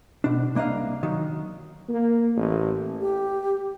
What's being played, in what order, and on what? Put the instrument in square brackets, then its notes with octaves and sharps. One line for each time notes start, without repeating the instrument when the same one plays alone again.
[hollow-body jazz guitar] B2 D4
C2 A#3 D4 D#5 F5
D#3 F#3
[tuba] A#3
A1
[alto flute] G4